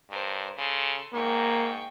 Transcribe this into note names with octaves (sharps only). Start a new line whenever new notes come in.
G2 A#4 C5
C#3 A4 C6
G#2 A#3 G5 C#6